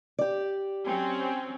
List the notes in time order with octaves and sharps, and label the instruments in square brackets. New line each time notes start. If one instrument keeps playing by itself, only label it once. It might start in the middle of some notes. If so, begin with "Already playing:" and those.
[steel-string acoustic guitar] G4 D5
[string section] F#3 C4 C#4